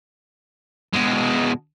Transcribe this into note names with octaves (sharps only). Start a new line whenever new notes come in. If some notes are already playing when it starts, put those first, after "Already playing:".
B2 G#3